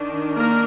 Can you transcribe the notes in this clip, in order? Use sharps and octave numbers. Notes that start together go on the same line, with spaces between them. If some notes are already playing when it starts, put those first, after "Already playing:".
Already playing: D#3 D4
A#3 A#4